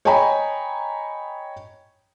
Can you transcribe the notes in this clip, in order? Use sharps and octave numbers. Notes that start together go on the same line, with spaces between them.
C#5 D#5 G5 G#5 A#5 B5